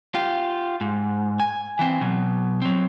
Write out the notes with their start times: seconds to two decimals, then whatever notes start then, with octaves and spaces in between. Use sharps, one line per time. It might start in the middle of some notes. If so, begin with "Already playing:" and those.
0.15 F4 G4
0.81 G#2
1.40 G#5
1.79 E3 C4
2.01 B2 F#3
2.62 F#3 C4